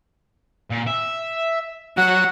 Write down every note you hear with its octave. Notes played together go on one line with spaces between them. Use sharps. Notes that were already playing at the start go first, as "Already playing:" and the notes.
A#2
E5
F#3 F#4 F#6